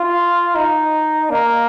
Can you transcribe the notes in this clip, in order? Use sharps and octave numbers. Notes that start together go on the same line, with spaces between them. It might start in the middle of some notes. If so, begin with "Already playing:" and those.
Already playing: F4
D#4
A#3